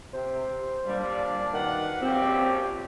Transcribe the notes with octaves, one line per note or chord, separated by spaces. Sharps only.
C3 C5
A#2 G3 D4 D5 F5
D#3 F#4 B4 F#5
A#1 F#2 F3 C4 G4